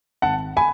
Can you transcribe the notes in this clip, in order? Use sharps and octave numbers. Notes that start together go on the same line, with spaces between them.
G#1 F#5 A5
G#5 B5